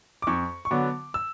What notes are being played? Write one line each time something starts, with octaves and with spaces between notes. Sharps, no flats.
D6
F2 C#6
C#6
D3 F#3 B3 D6
E6